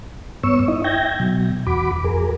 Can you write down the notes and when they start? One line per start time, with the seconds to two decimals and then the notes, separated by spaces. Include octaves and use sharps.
0.43 G2 B3 C#5 C#6 E6
0.68 D#4 E4 D#5
0.84 E5 G5 G6 G#6 A#6
1.20 B2 F#3
1.67 E2 F#4 B5 D6
2.04 F2 G#4 A#4